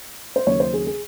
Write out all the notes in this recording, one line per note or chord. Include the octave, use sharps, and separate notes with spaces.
C5
D#2 C#3 F#3 A#3 C#4 C#5
C5
G#4
G#4